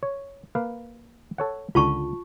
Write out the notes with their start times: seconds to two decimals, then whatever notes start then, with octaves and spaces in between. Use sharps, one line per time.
0.03 C#5
0.55 A#3 B4 F5
1.38 A4 C#5 F#5
1.75 C#2 D3 F4 A5 C#6